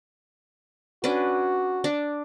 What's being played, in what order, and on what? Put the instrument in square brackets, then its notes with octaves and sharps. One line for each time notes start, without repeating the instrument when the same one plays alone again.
[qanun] C#4 D4 B4 [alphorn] F#4
[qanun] D4